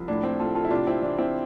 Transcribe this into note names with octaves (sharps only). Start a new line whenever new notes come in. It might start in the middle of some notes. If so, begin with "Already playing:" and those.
Already playing: C2 F3
A2 D4
C4
A2 F4 A4
F4 A4
E4
C3 D4 F4
C4 E4
E3 D4
C4 E4